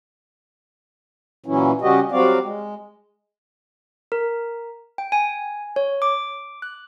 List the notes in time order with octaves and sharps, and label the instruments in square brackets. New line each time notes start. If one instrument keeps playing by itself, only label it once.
[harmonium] A#2 E3 F#3 C#4 E4
C#3 G3 C#4 F#4 G4 D#5
F#3 G3 C4 F#4 D5 F5
G#3
[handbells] A#4
G5
G#5
C#5
D6
F#6